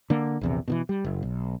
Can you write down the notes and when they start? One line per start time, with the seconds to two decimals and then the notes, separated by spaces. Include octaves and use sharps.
0.10 D3 A#3
0.41 A#1 E2 C3
0.68 B2 D3 E3
0.89 G3
1.05 F#1
1.23 B1